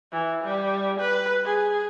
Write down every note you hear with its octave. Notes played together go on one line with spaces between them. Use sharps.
E3
G3
B4
G#4